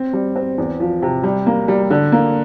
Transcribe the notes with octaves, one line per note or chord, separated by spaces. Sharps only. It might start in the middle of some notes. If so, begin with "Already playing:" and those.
Already playing: C4
G3
C4
E2
F3
C3
G3
A#3
G3
D3
A#3